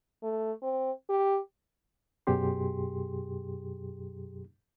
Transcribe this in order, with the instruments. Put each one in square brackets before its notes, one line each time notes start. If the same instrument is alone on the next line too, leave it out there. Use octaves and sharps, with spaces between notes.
[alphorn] A3
C4
G4
[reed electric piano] F#2 B2 F#3 G4 G#4 C6